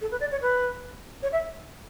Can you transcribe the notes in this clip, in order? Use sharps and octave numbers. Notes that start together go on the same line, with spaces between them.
A4
B4
D5
C#5
B4
C#5
E5